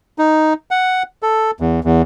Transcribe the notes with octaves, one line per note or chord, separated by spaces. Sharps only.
D#4
F#5
A4
E2
E2